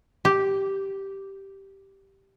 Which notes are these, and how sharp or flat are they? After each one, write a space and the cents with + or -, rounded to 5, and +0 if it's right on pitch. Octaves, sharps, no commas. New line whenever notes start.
G4 -5